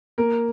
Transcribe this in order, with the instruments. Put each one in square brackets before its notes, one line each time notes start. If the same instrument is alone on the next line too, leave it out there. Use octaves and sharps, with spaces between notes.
[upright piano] A#3 A#4